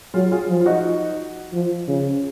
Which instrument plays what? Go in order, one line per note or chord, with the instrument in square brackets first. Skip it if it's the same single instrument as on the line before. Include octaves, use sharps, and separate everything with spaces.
[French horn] F#3 [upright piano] F4 G#4
[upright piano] F4 G#4
[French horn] F3
[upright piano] F4
D#4 F#4
[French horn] F3
C#3